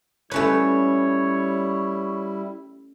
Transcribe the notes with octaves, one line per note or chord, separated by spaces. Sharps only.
G3 A3 C#4 E4 B4 C#5